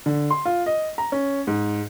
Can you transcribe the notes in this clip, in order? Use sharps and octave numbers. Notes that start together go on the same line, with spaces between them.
D3
C6
F4
D#5
A#5
C#4
G#2